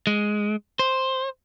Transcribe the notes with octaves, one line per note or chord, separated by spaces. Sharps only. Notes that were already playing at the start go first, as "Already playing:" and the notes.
G#3
C5